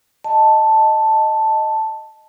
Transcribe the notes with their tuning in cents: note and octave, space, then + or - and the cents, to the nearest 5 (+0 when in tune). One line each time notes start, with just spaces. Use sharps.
D#5 +0 A5 +0